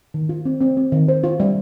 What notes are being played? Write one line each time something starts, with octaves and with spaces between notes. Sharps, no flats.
D#3
F4
C4
C4
C4
D#3
C5
F4
G3